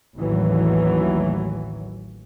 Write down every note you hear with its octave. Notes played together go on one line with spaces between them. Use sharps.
A1 D#2 E3 F#3